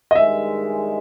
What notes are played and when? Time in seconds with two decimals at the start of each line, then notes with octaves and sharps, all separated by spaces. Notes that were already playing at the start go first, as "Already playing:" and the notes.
0.11 D#5
0.16 G2 D#3 G#3 E5